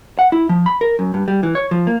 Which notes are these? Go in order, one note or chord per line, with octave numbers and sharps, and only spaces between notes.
F#5
E4
F3
B5
A#4
F#2
G2
G3
E3
C#5
F3
A#3